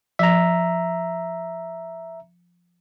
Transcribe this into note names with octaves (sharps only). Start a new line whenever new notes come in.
F3 E5 A#5